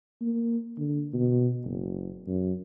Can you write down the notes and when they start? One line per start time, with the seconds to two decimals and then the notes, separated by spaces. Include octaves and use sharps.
0.21 A#3
0.78 D3
1.14 B2
1.65 F#1
2.27 F#2